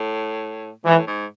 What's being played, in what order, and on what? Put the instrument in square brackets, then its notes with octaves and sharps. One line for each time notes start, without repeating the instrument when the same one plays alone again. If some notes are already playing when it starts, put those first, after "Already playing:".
Already playing: [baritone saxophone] A2
[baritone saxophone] G#2 [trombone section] E3
[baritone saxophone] A2
G#2